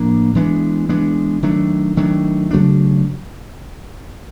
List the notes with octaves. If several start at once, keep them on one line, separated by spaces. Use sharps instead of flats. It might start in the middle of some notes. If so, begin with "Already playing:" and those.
Already playing: A2 F3 A#3 D4
E3 G#3 B3 D4
E3 G#3 B3 D4
D#3 F#3 A3 D4
D#3 F#3 A3 D4
C#3 F#3 A3 D4